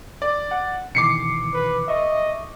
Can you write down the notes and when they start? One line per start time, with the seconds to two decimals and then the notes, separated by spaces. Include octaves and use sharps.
0.22 D5
0.51 F#5
0.95 B2 D#3 E3 D6 C7 C#7
1.54 B4
1.88 D#5 E5 C#6